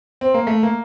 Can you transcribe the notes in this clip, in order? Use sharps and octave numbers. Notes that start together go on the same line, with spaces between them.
C4
A#3
A3
A#3